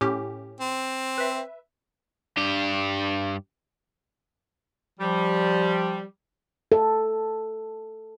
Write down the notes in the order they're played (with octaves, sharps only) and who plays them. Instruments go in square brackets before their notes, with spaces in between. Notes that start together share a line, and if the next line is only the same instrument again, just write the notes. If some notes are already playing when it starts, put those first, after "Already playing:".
[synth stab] A2 C#4 G4
[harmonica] C4
[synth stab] B4 E5
[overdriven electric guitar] G2 G4
[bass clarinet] F3 [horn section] G3
[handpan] A4